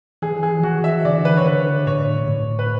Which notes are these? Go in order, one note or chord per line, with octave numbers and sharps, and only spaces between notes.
E3 G#4
G#4
E3 F#4
E5
D3 D5
B4
C#5
D3 B4
A2 C#5
A2
B4